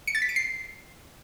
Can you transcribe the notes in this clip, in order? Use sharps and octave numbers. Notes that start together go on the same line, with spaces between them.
C#7
A6
B6
D7
C7